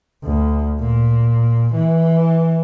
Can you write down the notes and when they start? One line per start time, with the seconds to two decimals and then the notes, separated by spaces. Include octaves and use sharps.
0.24 D2
0.79 A#2
1.74 E3